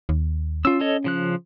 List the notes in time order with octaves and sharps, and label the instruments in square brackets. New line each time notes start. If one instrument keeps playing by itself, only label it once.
[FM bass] D#2
[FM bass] C#4 [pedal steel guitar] F4 E6
[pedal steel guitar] A4 C#5 D#5
C#3 F3 F#6